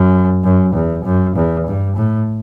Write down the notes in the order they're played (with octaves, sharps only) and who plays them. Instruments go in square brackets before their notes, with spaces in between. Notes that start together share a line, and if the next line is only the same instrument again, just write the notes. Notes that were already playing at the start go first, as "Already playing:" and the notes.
Already playing: [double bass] F#2
F#2
E2
F#2
E2
G2
A2